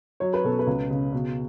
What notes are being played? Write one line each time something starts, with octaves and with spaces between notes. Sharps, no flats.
F#3 C#5
B4
B2 A4
B4
C#2
C#3
B2